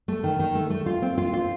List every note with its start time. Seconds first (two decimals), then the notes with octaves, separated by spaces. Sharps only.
0.08 A3
0.24 D#3
0.39 D#3
0.55 A3
0.70 A3
0.86 F4
1.02 C4
1.18 F4
1.33 F4